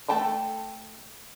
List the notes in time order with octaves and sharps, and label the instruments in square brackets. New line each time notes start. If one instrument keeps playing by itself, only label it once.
[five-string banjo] A3 A4 G5 A5 B5